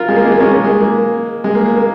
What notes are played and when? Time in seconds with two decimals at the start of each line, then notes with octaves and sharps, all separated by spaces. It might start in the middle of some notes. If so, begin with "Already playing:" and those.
Already playing: F4 A#4
0.08 G#3
0.16 A#3
0.25 G#3
0.32 A#3
0.40 G#3 C#4
0.48 A#3
0.64 G#3
0.80 A#3
1.44 G#3
1.55 A#3
1.66 A#3
1.76 A#3